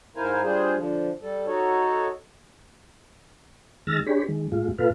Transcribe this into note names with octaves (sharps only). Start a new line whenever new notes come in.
G#2 E4 A#4 C5 F5 G#5
G3 D4 F4 G#4 C5
D3 F3
G3 A4
D#4 F#4 A4 C#5
D#3 G#3 E6 F6 A6 A#6
D4 G4 G#4 C#5 B5
D#3 G#3
A2 G#3 F4
A#2 F4 A4 B4 F5